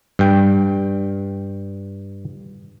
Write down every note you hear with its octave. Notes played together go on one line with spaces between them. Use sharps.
G2 G5